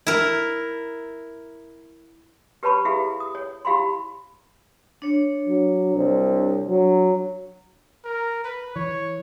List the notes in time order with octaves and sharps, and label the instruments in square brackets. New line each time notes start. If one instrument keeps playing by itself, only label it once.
[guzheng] E4 A#4
[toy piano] G4 B4 C#5 A5 B5 C#6
E4 G4 G#4 E5 F5
D#6
C#5
E4 G4 F5 B5 C6
[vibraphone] D4 C#5
[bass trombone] F#3
C2
F#3
[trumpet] A#4
B4
[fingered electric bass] E3 [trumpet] C#5